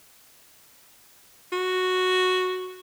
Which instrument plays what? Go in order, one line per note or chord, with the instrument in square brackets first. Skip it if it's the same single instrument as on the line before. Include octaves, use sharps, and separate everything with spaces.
[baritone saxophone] F#4